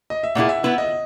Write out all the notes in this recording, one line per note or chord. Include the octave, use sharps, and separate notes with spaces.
D#5
E5
A#2 A#3 C#4 E4 G#4 F#5
E5
B3 E4 B4 E5
D#5